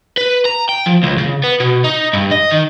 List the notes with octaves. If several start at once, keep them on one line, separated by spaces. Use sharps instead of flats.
B4
A#5
G5
F3
C#2
C#3
B3
B2
D#4
G2
D#5
D#3